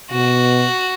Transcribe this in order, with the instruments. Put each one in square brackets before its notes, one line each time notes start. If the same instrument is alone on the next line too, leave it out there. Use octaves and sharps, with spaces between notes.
[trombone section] B2 [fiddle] F#4